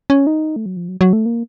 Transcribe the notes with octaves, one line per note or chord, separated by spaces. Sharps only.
C#4
D#4
A3
F#3
F3
F#3
F#3
A3
A#3